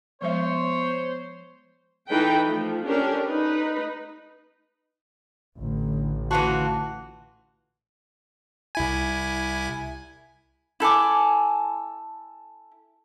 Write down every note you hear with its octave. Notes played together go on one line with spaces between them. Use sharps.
F3 G#3 B3 C5 C#5 E5
E3 D#4 A4 B4 G5
F3 A3
C#4 D4 G4 A4 A#4
D#4 B4
A1 D3
D3 E3 F4 F#4 A5 C#6 C#7
C2 E4 G#5
E4 A4 G#5 D6